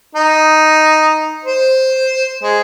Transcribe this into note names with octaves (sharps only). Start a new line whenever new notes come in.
D#4
C5
G#3